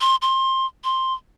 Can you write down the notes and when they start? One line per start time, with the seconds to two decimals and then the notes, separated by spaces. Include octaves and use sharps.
0.01 C6
0.22 C6
0.84 C6